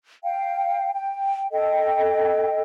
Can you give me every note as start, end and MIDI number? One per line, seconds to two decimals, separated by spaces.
0.23 0.90 77
0.23 0.90 79
0.93 1.46 79
1.52 2.62 69
1.52 2.62 75
1.52 2.62 79